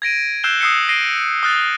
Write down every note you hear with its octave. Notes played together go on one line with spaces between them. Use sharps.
G#6 A#6 D7 D#7
E6 F#6 G6 C7 E7 G7
D#6 E6 C7 C#7
A#6 C7 D7 D#7 G7
D#6 F6 F#6 A6